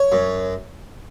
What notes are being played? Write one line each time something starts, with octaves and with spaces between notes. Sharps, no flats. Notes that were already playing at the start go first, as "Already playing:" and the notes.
Already playing: C#5
F#2